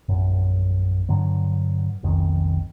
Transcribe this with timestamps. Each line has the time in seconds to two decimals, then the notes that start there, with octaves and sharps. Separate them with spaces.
0.09 A#1 F#2
1.09 G2 D3 F#3
2.03 F1 B1 F2 D#3